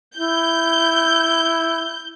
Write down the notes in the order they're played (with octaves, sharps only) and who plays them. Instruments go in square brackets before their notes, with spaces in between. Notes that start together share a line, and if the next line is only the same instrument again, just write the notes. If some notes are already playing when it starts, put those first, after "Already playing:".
[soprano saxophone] E4 [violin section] G6